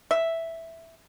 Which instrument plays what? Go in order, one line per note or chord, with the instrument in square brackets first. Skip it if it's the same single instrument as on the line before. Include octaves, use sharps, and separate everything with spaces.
[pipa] E5